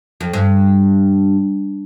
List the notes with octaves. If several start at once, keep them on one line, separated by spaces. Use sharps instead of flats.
F2
G2